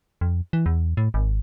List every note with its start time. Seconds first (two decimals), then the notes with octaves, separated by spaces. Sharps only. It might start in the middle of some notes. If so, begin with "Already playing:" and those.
0.21 F2
0.53 E3
0.66 E2
0.97 A2
1.14 G#1